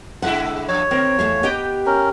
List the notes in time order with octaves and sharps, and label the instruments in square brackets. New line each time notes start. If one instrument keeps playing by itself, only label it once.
[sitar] B2 G#3 E4 [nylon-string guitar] D3 E5 F#5
[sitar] G2 F3 [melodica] C#5
[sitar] D#3 A#4 [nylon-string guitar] C4 C5
[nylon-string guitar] E2 A3 F5 [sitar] F3
[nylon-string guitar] B3 D#5 G5 [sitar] G4
[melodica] C#4 A#4